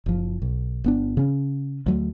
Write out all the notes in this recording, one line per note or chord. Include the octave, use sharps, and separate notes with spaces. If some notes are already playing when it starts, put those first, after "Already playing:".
F#1 F3
B1
G1 B3 D4
C#3 C#4
D2 F#3 A3